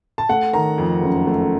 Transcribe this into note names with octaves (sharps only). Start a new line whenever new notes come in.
A5
A3 F#5
D#3 A#5
F2
F#1
A3